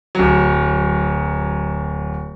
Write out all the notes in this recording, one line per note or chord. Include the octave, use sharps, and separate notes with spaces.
D1 F#3